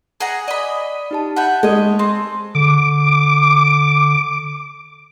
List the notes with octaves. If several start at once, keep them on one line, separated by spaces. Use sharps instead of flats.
G#4 F#5 A#5
D5 D#5 B5
D#4 G4 A5
E5 F#5 A5 B5 G6
G#3 C#5 D#5
C4
D3 D6